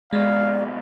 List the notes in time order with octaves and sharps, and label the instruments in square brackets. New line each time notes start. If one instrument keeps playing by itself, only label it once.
[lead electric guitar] C#2 B2 [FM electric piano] G#3 [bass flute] D5 [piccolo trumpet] F5